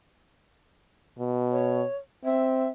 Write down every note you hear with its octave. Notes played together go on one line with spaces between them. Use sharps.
B2
C#5
C4 E5